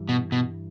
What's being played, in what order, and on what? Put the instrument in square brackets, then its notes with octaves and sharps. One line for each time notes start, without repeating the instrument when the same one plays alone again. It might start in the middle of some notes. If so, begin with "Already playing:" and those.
Already playing: [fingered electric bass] G2 E3 G3
[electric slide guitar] B2
B2